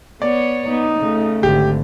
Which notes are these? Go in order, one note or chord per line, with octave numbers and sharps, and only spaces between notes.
B3 C#5 D5
B3 D#4
C#3 A3
G#1 D3 G4